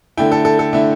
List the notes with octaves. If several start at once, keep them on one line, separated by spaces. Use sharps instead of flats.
D3 A3 E4 G5
A4
A4
A4
D3 A3 E4